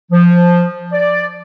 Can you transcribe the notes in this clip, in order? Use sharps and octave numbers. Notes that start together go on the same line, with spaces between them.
F3
D5